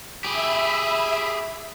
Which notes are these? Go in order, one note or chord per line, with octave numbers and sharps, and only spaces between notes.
G4 G#4 E5 B5